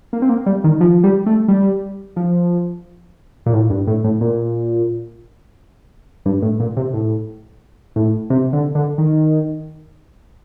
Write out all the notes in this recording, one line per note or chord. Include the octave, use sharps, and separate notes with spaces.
A#3
C4
A#3
G3
D#3
F3
G3
A3
G3
F3
A#2
A2
G2
A2
A2
A#2
G2
A2
A#2
C3
A2
A2
C3
D3
D3
D#3